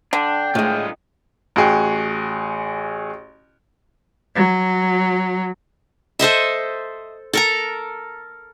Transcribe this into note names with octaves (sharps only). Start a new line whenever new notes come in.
D3 D4 G5
A2 G#3 F4 D#5
A1 F#4 G#4 G5
F#3
A4 C5 D#5 E5
A4 A#4 A#5